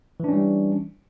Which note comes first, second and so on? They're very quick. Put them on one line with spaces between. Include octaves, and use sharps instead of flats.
E3 D4 C#4 G3